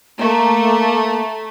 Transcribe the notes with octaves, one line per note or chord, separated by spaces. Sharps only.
A3 A#3 A#5 C#6